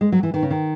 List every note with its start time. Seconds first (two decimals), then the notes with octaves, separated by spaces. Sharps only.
0.01 G#3
0.12 F#3
0.23 E3
0.34 D#3
0.42 C#3
0.51 D#3